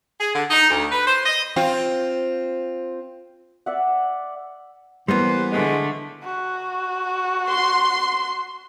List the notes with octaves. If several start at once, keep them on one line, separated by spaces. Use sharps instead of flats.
G#4
D3
D#4
D2
B4
C5
D#5
C4 F4
D5 E5 F#5
E3 G3 A#3 B3 C5
D3 G#3 A3
F#4
C6